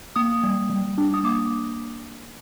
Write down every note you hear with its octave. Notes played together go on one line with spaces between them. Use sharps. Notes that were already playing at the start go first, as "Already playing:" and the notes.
A#3 D#6
G3
G3
D4
D#6
A#3 D6